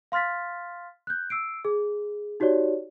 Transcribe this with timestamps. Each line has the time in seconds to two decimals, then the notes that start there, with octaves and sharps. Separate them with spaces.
0.12 F5 C6 F6 A6 B6
1.07 F#6 G6
1.30 E6 C7 D7
1.65 G#4
2.40 D#4 F#4 G4 C#5 D5